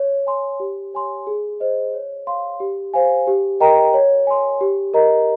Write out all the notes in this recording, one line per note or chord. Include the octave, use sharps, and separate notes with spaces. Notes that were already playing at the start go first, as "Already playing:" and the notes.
Already playing: C#5
G#5 C6
G4
C#5 G#5 C6
G#4
C5 D#5
C#5
F5 C6
G4
C5 F5 G#5
G4
A#4 D#5 G5 A#5
C#5
G#5 C6
G4
A#4 D#5 A#5